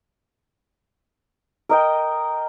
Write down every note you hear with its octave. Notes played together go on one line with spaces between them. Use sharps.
A#4 D#5 G5